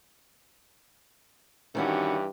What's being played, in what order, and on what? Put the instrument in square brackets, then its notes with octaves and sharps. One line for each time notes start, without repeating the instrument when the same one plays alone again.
[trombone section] G2 E3 G4 [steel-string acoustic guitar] D#3 C#4 F#4